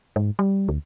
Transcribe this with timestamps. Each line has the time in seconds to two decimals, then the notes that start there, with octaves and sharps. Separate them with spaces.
0.16 G#2
0.39 G3
0.69 D2